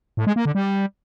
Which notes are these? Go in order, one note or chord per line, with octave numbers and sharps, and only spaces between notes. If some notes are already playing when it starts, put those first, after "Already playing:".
A2
G#3
A#3
D3
G3